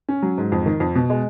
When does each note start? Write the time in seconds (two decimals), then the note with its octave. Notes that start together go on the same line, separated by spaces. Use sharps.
0.09 C#4
0.22 F#3
0.38 G#2
0.52 F2
0.66 D#3
0.80 F2
0.95 B2
1.10 G#3